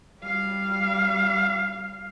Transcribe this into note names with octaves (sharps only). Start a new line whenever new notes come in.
G3 F5